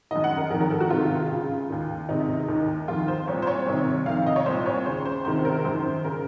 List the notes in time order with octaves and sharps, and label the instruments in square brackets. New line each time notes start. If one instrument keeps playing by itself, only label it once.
[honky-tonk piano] F#2 D#3 D#5
F#5
A#4
F2 A#4
D#3
A#4
A4
F#4
C#2 C3 D#3 F4
C#2 C#3
D#2 D#3
C#2 C3 D#3 D#4
D#2 D#3
F2 D#3 F4
C5
C2 A#2 C#5
C5
C#5
C2 C3 D#3
F2 C3 D#3 F5
F5
D#5
C#5
C2 A#2 C5
C#5
D#2 C#3 C5
C5
C#2 C3 D#3 C5
A#4
F#2 D#3 C5
C#3 A#4